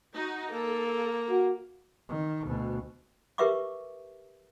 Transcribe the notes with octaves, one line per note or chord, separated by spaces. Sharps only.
D#4 F#4
A#3 A4
F#4
D#3
D2 B2
G4 A#4 B4 E5 C#6 D6